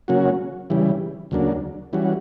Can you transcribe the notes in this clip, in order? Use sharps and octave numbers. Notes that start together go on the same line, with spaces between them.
C#3 F#3 A#3 C#4 F#4
C#3 E3 G3
D2 C#3 F#3 A#3 D4
E3 G3 C#4 F#4